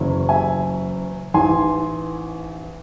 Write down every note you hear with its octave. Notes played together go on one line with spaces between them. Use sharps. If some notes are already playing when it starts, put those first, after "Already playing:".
Already playing: F#1 E2 C#3 F#3 C#4
E5 G#5
A1 G#2 E3 G#5 C6